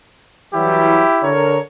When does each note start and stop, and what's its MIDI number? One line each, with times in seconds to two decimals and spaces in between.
0.54 1.03 52
0.54 1.03 54
0.54 1.03 55
0.54 1.33 64
0.54 1.33 67
1.22 1.57 50
1.22 1.57 70
1.22 1.57 73